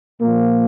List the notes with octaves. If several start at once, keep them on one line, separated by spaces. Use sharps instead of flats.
A#2 F3 A#3